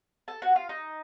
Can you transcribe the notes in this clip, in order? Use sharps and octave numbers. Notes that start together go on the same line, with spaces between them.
A4 A5
F#4 F#5
F4 F5
D#4 D#5